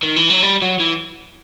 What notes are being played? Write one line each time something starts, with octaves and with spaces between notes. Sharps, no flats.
D#3
E3
F#3
G3
F#3
E3